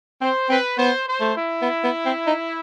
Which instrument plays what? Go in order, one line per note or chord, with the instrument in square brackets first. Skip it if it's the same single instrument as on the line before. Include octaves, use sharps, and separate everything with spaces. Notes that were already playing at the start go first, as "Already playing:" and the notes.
[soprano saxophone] C4 [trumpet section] C5
[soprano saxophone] C4 [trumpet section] B4
[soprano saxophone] B3 [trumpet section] C5
[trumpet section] C5
[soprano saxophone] A3
[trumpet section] E4
[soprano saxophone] B3
B3
C4
D#4